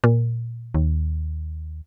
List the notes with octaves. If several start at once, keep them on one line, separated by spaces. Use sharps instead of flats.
A#2
D#2